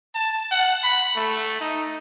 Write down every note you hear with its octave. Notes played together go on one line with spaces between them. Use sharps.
A5
F#5
B5
A3
D#4